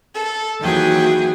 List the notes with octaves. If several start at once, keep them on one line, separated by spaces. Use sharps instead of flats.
A4
D#2 E3 F#3 G#4 G5